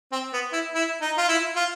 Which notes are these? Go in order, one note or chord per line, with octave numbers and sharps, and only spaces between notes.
C4
B3
E4
E4
D#4
F4
E4
F4